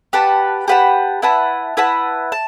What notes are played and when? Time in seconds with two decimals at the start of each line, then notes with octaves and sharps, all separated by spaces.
0.13 G4 B4 F#5 A5
0.68 G4 B4 F#5 A5
1.22 E4 B4 F#5 A5
1.77 E4 B4 F#5 A5
2.32 A5